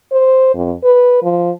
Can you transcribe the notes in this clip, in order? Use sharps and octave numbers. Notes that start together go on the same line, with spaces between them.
C5
F2
B4
F3